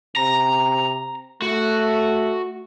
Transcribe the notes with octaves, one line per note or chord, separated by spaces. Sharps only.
C3 A#5
A3 F#4